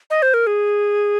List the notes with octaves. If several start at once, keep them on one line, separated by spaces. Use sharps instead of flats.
D#5
C5
A#4
G#4